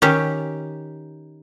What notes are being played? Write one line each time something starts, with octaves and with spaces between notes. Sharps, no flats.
D#3 C#4 G4